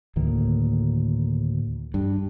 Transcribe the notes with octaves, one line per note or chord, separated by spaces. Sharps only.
D2 A2 D#3 A#3
G2